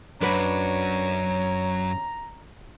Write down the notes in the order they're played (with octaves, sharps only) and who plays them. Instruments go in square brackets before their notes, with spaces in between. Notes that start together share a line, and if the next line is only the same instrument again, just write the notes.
[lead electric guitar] F#2 F#4 [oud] D4 B4 [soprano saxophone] C#5 [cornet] A#5